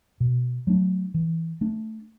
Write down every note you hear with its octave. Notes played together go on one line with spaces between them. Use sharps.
B2
F#3 A3 D4
E3
A3 D4